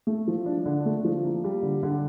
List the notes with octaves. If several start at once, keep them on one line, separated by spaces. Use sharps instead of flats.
A3
F3
D4
D3
A3
F3
A#3
G3
D3
D3